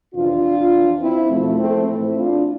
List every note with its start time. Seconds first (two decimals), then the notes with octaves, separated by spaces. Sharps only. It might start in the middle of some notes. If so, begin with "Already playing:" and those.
0.13 F2 C3 E3 D4 F4
0.72 F2 E3
1.00 C4 E4
1.30 E2 B2 F3 A3
1.58 A3 C4
1.87 A2 E3 C4 E4
2.17 D4 F4